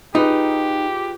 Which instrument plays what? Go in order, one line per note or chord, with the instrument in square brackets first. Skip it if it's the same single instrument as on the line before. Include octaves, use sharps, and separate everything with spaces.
[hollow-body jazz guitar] D#4 [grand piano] F4 G#4 B4 [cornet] G4